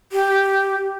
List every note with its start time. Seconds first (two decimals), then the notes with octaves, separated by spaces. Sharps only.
0.12 G4